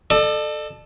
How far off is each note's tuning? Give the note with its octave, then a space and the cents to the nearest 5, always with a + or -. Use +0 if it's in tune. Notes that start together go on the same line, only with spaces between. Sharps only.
A4 +0 D5 +45